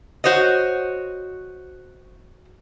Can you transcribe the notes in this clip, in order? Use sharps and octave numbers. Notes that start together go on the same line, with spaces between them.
F#4 C5 C#5 D#5